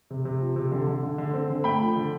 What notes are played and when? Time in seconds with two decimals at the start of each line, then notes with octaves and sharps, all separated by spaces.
0.10 C3
0.25 C3
0.41 F3
0.56 C3
0.72 D3
0.87 D3
1.03 D3
1.18 D3
1.33 C4
1.50 D3
1.64 A3 G5 B5
1.80 F3
1.96 D3